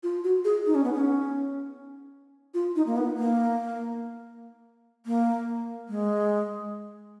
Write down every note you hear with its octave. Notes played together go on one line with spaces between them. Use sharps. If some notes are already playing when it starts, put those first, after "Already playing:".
F4
F#4
G#4
D#4
C#4
B3
C#4
F4
D#4
A#3
B3
A#3
A#3
G#3